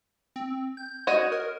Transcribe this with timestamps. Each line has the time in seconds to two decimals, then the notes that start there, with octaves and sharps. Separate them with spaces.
0.36 C4
0.77 G6
1.07 F#4 C#5 D#5
1.32 A#4